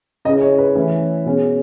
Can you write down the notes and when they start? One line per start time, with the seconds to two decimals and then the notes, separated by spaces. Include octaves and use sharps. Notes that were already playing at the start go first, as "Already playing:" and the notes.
0.25 C#3 G#3 C#4 E4 D#5
0.41 C#5
0.59 B4
0.75 E3 A3 C#4 E4
1.25 B2 G#3 C#4